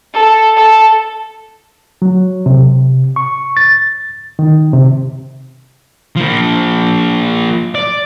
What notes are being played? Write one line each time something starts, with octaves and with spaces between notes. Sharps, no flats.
A4
A4
F#3
C3
C#6
A6
D#3
C3
F3 A#3
D5